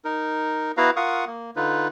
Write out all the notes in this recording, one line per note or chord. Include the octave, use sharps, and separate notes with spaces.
D#4 A#4
B3 E4 F#4 B4 F5 A#5
F4 A#4 F5 F#5 C#6 D#6
A#3
D3 D#4 F4 B4